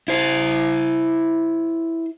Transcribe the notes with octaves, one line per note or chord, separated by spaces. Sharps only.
E4 C5